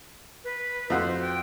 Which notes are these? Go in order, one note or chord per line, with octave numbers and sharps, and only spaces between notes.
B4
F2 F#4 C5
G5